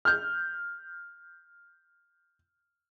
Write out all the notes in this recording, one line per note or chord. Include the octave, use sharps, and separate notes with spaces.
F6 G6